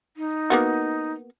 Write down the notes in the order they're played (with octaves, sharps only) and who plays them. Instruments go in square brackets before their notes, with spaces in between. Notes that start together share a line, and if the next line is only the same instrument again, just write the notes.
[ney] D#4
[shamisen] A#3 B3 F#4